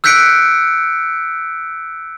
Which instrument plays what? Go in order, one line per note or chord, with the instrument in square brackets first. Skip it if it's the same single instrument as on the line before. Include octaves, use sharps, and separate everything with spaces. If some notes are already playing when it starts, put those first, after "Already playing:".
[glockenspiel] E6 F#6 G6 B6 C#7 D7